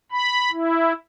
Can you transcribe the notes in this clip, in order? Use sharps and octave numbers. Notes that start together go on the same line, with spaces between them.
B5
E4